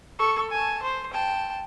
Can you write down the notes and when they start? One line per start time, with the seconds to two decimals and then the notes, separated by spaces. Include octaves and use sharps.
0.19 A4 C#6
0.51 G#5 A5
0.83 C5
1.13 G5 A5